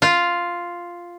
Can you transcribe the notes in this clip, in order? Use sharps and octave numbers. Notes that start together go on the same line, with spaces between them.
F4